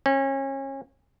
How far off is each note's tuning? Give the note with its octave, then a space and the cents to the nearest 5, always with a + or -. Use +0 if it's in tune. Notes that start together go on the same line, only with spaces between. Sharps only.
C#4 -30